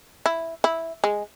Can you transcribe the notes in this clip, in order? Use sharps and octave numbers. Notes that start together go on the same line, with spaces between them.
E4
E4
G#3